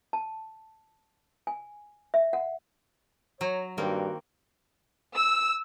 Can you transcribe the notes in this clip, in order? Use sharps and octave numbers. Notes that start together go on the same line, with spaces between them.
A5
G#5
E5
F#5
F#3 C#5 A#5
G2 D#3 A#3 C4 F#4
E6